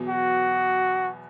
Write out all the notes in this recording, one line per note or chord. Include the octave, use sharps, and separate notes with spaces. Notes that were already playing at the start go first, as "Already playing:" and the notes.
Already playing: E2 B2 F#3 B3
F#4